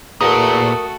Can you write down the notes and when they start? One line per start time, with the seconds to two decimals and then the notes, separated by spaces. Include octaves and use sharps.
0.21 E2 A#2 A3 F#4 A#4 D#6